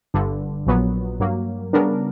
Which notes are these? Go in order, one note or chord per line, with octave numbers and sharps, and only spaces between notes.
G1 G2 D3
A#1 A#2 F#3 B3
G2 F#3 A#3
C#3 G3 B3 D4 A#4